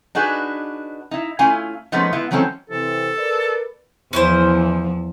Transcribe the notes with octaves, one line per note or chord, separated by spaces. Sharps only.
D4 D#4 F#4 G#4 B4
D#4 E4
A3 C#4 E4 F4 F5 G#5
F3 G#3 A3 B3 C#4 D#4
G#3 B3 E4 F4
E3 F#3 G#3 C4 C#4 A4
C3 E3 A4
A#4 B4 D5
E2 F3 C#4 E4 C5